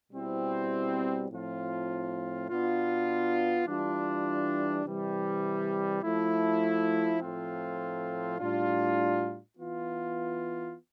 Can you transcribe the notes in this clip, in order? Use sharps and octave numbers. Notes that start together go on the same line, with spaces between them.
B2 G3 C4 E4
A2 F3 C4 F4
B2 B3 D4 F4
E3 G3 D4 F4
C3 E3 G3
F3 A3 E4
A2 F3 A3 C4 F4
A2 G3 D4 F4
E3 B3 F4